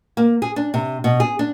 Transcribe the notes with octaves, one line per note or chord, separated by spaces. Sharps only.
A#3
G#4
D4
C3
B2
G#4
D4